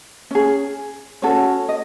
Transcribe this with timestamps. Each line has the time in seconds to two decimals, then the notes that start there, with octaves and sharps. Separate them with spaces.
0.31 C#4 G#4
1.22 C#4 F#4 A4 C#5
1.69 D#5